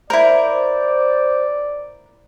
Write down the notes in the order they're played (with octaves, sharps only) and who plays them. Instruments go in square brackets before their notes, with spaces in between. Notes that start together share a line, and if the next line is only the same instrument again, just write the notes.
[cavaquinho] E4 A#4 [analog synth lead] C5 [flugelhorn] D5